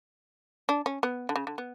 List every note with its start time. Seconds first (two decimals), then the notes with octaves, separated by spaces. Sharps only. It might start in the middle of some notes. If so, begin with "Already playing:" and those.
0.69 D4
0.86 C#4
1.03 B3
1.29 D3
1.36 C#3
1.47 D3
1.58 B3